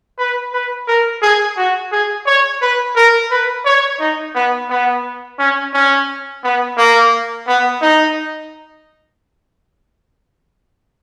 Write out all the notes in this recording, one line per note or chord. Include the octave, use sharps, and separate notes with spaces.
B4
B4
A#4
G#4
F#4
G#4
C#5
B4
A#4
B4
C#5
D#4
B3
B3
C#4
C#4
B3
A#3
B3
D#4